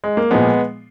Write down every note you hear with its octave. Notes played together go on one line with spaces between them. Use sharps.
G#3
A#3
A#2 F3 G#3 B3